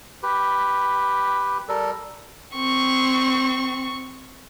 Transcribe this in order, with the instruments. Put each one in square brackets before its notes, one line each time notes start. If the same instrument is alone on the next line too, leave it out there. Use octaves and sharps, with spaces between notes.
[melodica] G4 B4
G3 A4 A#4
[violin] C4 C#6